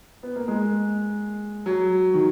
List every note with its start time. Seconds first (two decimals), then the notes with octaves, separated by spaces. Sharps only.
0.23 B3
0.36 A#3
0.48 G#3
1.66 F#3
2.14 D#3